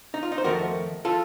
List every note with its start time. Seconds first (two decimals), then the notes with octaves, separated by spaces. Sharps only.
0.14 D#4
0.23 F4
0.32 D#4
0.38 C5
0.44 F2 D#3 A3 F#4 A#4
1.05 F4 A4